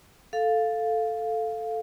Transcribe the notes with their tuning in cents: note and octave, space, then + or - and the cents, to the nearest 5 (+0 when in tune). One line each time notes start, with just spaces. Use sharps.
A4 +0 F5 +0